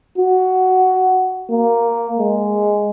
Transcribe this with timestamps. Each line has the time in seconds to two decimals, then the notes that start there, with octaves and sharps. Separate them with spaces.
0.18 F#4
1.51 A#3
2.19 G#3